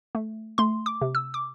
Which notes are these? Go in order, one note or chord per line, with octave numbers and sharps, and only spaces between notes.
A3
A3 C6
D6
C3
E6
D6